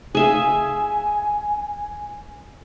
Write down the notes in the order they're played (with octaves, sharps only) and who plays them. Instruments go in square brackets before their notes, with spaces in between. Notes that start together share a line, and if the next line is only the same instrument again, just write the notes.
[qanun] G#4 E5 F5 [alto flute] G#5